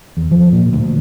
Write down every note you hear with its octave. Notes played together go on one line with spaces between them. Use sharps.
E2
F3
A#2
D2